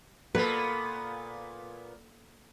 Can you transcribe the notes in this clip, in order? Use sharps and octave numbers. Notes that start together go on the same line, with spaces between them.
A#2 A#3 B3 A4 B4